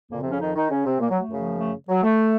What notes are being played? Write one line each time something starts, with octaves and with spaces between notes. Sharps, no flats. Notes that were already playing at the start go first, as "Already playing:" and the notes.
F2 A#2 C#3 F3 A#3
C3 C4
C#3 C#4
D#3 D#4
D#3 D#4
C#3 C#4
C3 C4
A#2 A#3
F#3
A3
F#2 C#3 F3
A3
F#3
A3